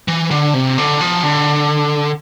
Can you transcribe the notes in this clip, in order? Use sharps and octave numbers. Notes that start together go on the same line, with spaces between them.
E3
D3
C3
D3
F3
D3